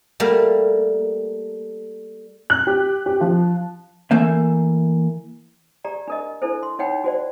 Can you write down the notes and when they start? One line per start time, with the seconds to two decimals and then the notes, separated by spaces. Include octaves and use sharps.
0.20 G3 A3 A#3
2.50 F#6
2.67 G4
3.06 G4
3.21 F3
4.11 E3 A3 A#3 E5
5.84 G4 D5 A#5
6.08 D4 A#4 D#5
6.42 D4 E4 A4 C5
6.63 C6
6.79 D#4 C#5 F#5 G5 B5
7.04 F#4 C5 D5